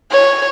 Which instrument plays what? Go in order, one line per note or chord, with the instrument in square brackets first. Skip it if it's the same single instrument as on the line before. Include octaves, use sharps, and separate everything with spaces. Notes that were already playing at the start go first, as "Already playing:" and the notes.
[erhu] C#5